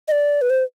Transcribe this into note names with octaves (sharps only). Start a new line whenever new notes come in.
D#5
D5
B4
C5